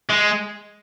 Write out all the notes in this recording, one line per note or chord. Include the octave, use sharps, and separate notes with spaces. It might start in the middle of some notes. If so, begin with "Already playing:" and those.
G#3